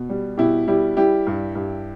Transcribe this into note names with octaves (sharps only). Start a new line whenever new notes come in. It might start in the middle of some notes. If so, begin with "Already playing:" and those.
Already playing: B2
G3
B2 E4 G4
G3 E4 G4
G3 E4 G4
G2
G2